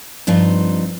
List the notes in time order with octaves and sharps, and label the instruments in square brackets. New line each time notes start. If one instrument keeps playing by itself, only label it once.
[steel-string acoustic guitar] G2 F3 C4 D#4